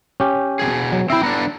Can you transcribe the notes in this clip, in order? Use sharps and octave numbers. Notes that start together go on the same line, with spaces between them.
C#4 G4
B2 F3 G#4
F#3
C4 E4 E5 G5
B3 D4 A4 A#5